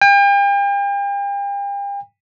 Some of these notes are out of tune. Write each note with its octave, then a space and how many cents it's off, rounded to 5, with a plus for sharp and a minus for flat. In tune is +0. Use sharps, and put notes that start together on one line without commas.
G5 +40